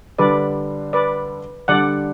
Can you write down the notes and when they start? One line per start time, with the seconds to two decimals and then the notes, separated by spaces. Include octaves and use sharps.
0.19 D3 G3 D4 B4 D5
0.93 B4 D5
1.68 D3 G3 D4 D5 F#5